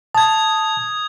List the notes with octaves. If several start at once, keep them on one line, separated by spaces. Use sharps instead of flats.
A5 D#6 G#6